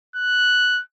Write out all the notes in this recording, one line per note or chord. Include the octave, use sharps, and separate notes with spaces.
F#6